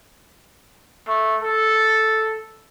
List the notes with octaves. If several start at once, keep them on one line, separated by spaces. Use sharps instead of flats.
A3
A4